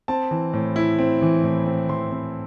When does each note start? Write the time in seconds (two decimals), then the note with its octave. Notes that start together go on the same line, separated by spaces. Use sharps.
0.08 C4 A5
0.31 E3
0.53 A2
0.76 E4
0.99 C4
1.22 E3
1.44 A2
1.66 C4
1.89 E3 C6
2.11 C4